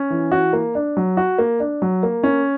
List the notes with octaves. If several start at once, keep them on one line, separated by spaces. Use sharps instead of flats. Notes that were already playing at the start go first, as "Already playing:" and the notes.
Already playing: C#4
E3
F#4
A#3
D4
F#3
F#4
A#3
D4
F#3
A#3
C#4